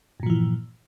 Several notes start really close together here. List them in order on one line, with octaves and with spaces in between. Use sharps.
G2 A#2 F3 E3